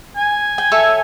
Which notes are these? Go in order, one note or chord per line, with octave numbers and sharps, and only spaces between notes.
G#5
G5
A4 C#5 E5